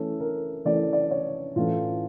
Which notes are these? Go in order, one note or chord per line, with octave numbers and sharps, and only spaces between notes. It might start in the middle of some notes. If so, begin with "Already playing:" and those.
Already playing: E3 A3 C#4 A4
A#4
E3 A3 C#4 D5
D5
C#5
A2 E3 A3 C#4 F4